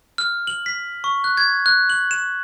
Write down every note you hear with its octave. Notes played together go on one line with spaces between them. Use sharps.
F6
F#7
B6
C#6
F#6
G#6
F#6
F#7
E7